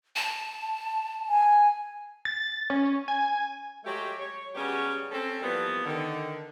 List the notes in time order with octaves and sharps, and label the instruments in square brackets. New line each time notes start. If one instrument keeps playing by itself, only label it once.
[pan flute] A5
[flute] G#5
[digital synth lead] A6
C#4
G#5
[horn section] F#3 G#3 A3 G4
C#5
C#3 F#3 G3 B3 C#4 G4
C4 C#4 A4
E3 F3 G3 A#3 B3
D3 D#3